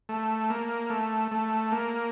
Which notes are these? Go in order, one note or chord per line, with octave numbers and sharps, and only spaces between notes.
A3
A#3
A3
A3
A#3